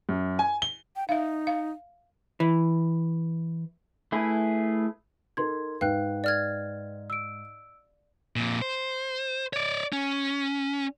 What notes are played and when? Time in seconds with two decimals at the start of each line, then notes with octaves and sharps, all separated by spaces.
0.09 F#2
0.39 G#5
0.62 G7
0.96 G5
1.09 D#4 E5 F5
1.47 F5
2.40 E3
4.12 A3 E4 G#4 B4
5.37 D#4 A4 A#4 C6 G#6
5.81 G#2 D#4 B4 F5 G5 F#6
6.24 D5 F6 G#6
7.10 E6 D7
8.36 F2 A#2
8.62 C5
9.53 C#5 D5
9.93 C#4